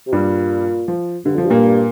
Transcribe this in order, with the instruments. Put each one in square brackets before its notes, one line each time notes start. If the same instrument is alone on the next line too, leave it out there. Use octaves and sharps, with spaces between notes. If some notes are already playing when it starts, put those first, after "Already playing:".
[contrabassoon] C3
[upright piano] G2 G3 [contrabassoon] A#2
[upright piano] F3
[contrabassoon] G2 [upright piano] D3
[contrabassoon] F2 [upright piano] F3
[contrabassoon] G2
[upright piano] A#2 A#3